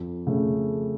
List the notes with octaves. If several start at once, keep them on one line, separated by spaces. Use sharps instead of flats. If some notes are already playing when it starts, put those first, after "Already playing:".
Already playing: F2
C#3 A3